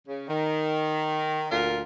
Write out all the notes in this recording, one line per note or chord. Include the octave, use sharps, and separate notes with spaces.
C#3
D#3
D2 A#2 F4 A#4